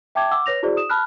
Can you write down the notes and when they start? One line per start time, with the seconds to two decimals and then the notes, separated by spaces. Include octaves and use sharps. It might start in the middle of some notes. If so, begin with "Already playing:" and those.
0.15 E5 G5 A5 D6 G#6
0.31 F#5 D6 E6
0.46 B4 C#5 A#6 F7
0.63 E4 F#4 G#4 C5 D5
0.77 D#6 E7
0.90 A5 B5 F6 F#6